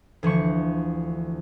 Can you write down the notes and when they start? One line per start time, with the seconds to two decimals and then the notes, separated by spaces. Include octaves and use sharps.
0.23 D2 E3 F3 C#6